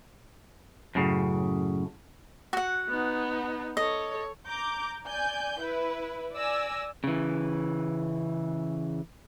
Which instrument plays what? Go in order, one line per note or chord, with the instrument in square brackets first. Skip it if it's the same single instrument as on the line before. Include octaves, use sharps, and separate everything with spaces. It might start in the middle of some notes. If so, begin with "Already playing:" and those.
[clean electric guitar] F#2 A2 C#3
[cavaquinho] F#4 F#5
[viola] B3 D#4
[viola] A4 C#5 [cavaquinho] D#5
[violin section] A#5 D6 G6
D5 G#5 G6
E4 B4
D5 G#5 E6 A#6
[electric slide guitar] C#3 E3